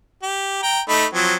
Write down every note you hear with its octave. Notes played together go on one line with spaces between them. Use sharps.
G4
G5 A#5
A3 D#4 B5
F3 F#3 C4